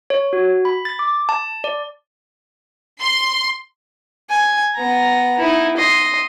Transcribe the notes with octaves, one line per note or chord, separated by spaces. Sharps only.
C#5
F#4
B5
A6
D6
A5
D5
C6
G#5
B3 A#5
D#4 E4
D#5 C6